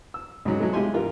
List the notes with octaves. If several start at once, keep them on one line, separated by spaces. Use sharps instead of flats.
E6
C#2 G#2 F#3
F#3 G#3 A3
G#3 E4 F4 G4 G#5 C6
G2 E3 F4 A#4